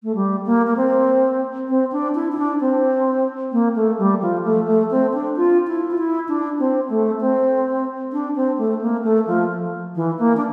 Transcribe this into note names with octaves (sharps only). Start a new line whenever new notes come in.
A3
G3
A#3
A#3
C4
C4
D4
E4
E4
D4
C4
A#3
A3
G3
F3
A3
A3
C4
D4
F4
E4
F4
E4
D4
C4
A3
C4
D4
C4
A3
A#3
A3
F3
E3
A#3
D4